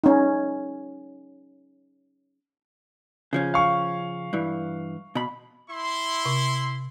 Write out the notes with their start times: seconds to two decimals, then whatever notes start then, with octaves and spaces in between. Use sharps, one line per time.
0.04 C#4 D#4
3.33 C#3 F3 C#4
3.54 F5 C#6
4.33 G2 E3
5.15 B2 B5
5.70 E4 C6
6.25 C3